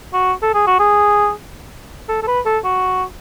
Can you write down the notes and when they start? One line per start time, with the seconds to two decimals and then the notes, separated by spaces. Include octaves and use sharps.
0.13 F#4
0.42 A4
0.54 G#4
0.67 F#4
0.79 G#4
2.09 A4
2.23 A4
2.27 B4
2.45 A4
2.64 F#4